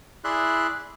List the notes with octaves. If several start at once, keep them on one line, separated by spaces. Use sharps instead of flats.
E4 G#4 D5 E5 C6 F#6